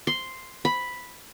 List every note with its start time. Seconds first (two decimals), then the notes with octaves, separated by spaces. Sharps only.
0.07 C6
0.65 B5